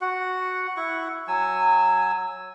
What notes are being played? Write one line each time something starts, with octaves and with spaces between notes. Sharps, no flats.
F#4 F#5
E4 F#5 C#6
F#3 G#5 E6